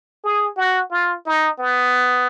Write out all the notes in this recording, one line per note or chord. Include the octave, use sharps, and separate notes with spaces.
G#4
F#4
F4
D#4
B3